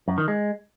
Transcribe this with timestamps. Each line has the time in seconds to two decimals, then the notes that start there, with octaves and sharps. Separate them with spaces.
0.08 F#2
0.18 D#3
0.28 G#3